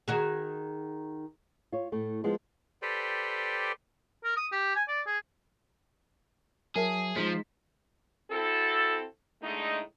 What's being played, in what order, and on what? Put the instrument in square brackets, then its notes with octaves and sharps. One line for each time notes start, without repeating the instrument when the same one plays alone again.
[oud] D#3 F#4 G#4
[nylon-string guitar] F4 C#5
A2 A3
F3 G#3 B3
[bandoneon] G4 A4 B4 C5 D5 G5
[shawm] A#4
D#6
G4
G#5
D5
G#4
[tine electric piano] F#3 [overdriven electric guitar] G#4 [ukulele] A#4 E5 A5
[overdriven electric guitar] F3 [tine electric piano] G#3 D#4 B6
[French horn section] C4 E4 F#4 A4
A2 D3 G#3 A3 D#4